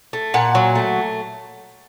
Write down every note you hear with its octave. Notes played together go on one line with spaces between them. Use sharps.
A3
A#2 F#5
F#3
A3